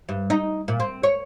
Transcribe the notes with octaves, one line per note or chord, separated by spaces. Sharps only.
G2
D#4
A#2
C4
C#5